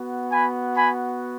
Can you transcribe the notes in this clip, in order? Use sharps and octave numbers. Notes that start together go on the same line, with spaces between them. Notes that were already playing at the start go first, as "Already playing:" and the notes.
Already playing: B3 F#4
G#5 B5
G#5 B5